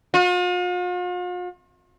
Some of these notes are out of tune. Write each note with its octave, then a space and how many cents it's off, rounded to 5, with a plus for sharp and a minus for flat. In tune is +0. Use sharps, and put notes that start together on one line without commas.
F4 +45